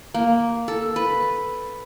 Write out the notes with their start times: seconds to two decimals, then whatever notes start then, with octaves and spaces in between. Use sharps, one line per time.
0.14 A#3
0.68 A4
0.96 B4